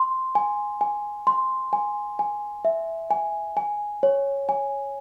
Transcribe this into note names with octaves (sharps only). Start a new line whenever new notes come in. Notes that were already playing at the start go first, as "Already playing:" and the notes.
Already playing: C6
G#5
G#5
C6
G#5
G#5
E5
G#5
G#5
C#5
G#5